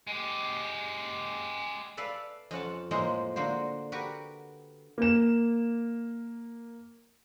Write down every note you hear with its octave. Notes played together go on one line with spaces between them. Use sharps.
G#3 G4
A4 B4 D5 E5 F5
F2 C#4 F#5 A5
A2 F3 G#3 A#3 C5 A#5
D3 A#3 F#4 C5
F#4 G4 A#4 B4
A#3 E7